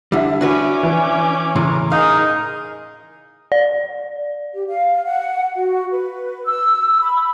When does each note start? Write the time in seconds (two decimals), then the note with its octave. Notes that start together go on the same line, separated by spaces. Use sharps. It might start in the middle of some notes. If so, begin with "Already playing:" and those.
0.12 D3 G3 E4 E5
0.41 C#4 D4 F#4 B4 D6
0.83 E3 E4 G#5
1.56 A2 C#3 E3 A#5 C6
1.92 D#4 G#4 A#4 F5 F6
3.52 D5
4.54 G4
4.68 F5
5.05 F#5
5.56 F#4
5.91 B4
6.46 E6
7.01 B5